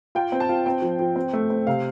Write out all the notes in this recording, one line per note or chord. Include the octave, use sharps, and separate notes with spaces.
F4 G5
C4
A5
F4
C4 G5
F3
F3
C4
A3
C4
C3 F5